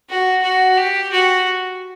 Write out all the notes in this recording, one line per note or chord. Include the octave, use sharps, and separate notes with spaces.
F#4
F#4
G4
F#4